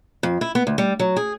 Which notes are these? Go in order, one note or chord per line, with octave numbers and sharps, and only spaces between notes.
F2
E4
B3
D2
G3
F#3
G#4